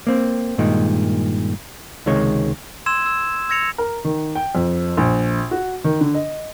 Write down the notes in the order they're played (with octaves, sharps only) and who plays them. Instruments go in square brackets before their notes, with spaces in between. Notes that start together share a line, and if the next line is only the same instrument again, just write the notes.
[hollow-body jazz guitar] A#3 C4
G2 A#2 D#3 G#3
C#2 C3 D#3 G#3 C#5
[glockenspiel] C6 E6 G#6 E7
E6
E6 G#6 A#6 C#7 F7
[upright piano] A#4
D#3
G5
F2
A#1
F#4
D#3
D3
D#5